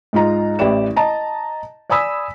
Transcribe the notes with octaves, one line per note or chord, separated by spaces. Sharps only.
G#2 D#4 F4 A#5
A1 E4 G4 D5 E7
D#5 A5 A#5
D5 G#5 B5 D#6 E6 B6